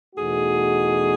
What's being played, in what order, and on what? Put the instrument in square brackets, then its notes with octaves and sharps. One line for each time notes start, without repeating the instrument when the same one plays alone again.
[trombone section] E2 B2 A3 D#4 F#4 [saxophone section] G#4